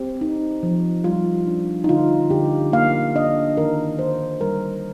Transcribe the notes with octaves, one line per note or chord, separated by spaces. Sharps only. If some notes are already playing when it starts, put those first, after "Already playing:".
Already playing: C4 G4
D#4
F3
G3 F4
D4
D#4
D3 F4
D3 G4
A#3 F5
D4 D#5
D#3 A#4
D#3 C5
G3 A#4